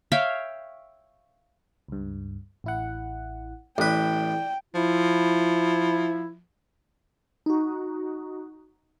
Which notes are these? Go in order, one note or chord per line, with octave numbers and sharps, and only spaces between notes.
C#5 E5 F5 G5
C#2 G2
A1 E4 F#5
A1 B4 D5 G5
F3 E4
D#4 F#4